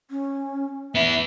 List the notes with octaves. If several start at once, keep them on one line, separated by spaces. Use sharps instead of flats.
C#4
B3 E4 E5